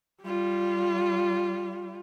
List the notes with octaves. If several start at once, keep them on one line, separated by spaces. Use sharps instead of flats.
G3 F4